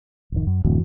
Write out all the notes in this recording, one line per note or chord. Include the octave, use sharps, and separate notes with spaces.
D1 F2 D#3
F#2
D1 F#2 E3 F#3